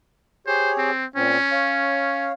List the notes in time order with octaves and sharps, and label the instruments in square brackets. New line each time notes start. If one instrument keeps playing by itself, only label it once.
[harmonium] G4 G#4 C#5 [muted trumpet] C5
[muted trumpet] C4
[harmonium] A#2 C4 [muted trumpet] C#4
[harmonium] C#5 F5